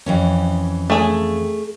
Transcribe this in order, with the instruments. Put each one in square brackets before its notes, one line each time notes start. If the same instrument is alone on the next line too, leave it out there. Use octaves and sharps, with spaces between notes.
[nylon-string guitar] F2 E3 C#4
[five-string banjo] A3 G#4